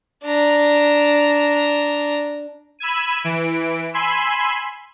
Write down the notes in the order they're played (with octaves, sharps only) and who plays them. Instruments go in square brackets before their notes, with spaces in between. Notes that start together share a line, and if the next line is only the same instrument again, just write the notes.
[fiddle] D4 A#5
[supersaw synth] B5 E6 G#6 D#7
E3 D7
G#5 B5 C6 E6